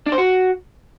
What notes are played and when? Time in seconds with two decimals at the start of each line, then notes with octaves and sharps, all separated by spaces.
0.06 D4
0.12 C5
0.18 F#4